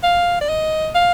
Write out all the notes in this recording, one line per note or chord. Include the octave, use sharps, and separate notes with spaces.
F5
D5
D#5
F5